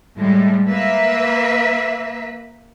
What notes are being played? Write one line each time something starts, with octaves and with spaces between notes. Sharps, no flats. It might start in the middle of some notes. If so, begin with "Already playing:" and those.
A2 G3 G#3
A#3 B4 E5